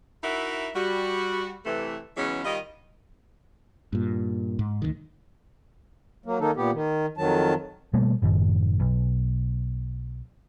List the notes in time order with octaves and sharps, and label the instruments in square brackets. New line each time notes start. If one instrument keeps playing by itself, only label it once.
[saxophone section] D#4 E4 F#4 A#4 E5
G3 F#4
C3 E3 A3
C#3 E3 F#3 G#3 B3 C#4
D#3 G3 F4 D#5
[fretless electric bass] G2 A#2
G#2
D2 D3 D#3
[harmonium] F#3 A#3
D#3 A#3 D#4 A4
A#2 B3 G4
D#3
F2 D#3 F#3 A5
[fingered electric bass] B2 G3 A3 A#3
F#1 F#2 A2 D#3
B1